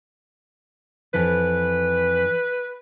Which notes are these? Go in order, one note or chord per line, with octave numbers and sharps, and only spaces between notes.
F2 E3 B4